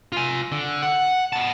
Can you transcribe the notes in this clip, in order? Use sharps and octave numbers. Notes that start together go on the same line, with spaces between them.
F4 G#5
D3
F#5
B3 A5